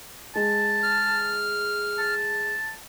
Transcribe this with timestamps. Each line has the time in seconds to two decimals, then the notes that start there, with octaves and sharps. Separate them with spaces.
0.36 G#3 A5
0.83 F6
1.99 A5